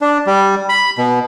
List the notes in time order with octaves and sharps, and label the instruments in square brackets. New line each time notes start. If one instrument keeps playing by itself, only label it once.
[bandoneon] D4
G3
B5
B2